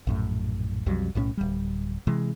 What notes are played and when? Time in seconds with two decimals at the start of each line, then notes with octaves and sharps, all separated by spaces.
0.07 A#1 F#2 A2
0.86 B1 F2 F#3 G3
1.15 B1 A2 F#3 C#4
1.37 D1 G3
2.07 C3 E3 G#3